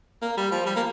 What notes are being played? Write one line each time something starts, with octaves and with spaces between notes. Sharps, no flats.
A#3
G3
F3
G3
A#3